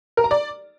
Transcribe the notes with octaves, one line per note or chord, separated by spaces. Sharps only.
A#4
A#5
D5